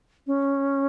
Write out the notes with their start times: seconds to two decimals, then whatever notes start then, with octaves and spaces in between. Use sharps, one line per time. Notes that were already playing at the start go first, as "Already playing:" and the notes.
0.27 C#4